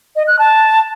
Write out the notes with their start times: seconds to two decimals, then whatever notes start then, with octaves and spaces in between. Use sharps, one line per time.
0.16 D#5
0.27 F#6
0.39 A5